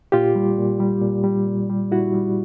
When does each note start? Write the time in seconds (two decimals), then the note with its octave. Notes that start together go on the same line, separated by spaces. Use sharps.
0.12 A#2 F4 G4
0.35 G3
0.58 A#2
0.80 G3
1.02 A#2
1.24 G3
1.46 A#2
1.70 G3
1.92 A#2 E4 F#4
2.14 G3